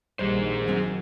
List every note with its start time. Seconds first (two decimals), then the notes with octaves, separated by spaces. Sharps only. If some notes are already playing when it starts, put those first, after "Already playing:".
0.19 A#1 D#3 G3 G#4 C5
0.68 F#3 C4